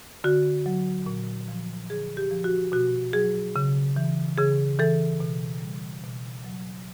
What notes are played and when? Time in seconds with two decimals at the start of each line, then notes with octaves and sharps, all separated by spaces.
0.24 D3 F#4
0.66 F#3
1.06 A#2
1.48 F3
1.89 D3 G#4
2.17 G4
2.31 F3
2.44 F#4
2.72 B2 F#4
3.13 F#3 G#4
3.56 C#3
3.96 E3
4.38 C#3 G#4
4.79 E3 A4
5.20 B2
5.62 G3
6.03 B2
6.44 F#3